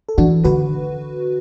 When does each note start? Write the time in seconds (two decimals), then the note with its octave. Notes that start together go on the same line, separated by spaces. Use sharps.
0.09 A4
0.18 E3 D4 F#4
0.44 D3 F#4 B4